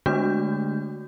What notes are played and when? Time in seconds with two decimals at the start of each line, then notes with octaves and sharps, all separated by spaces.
0.06 D3 G#3 A3 D4 F#4 G6